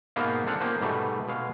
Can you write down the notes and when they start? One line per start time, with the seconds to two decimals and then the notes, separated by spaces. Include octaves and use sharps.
0.16 G#2 B2 A#3 B3 C5 F5
0.46 C4 D4 F4 A4 F5 F#5
0.60 F3 A#3 C#4 G4 C5
0.81 G#2 B2 G3 A3
1.28 B2 G#3 F5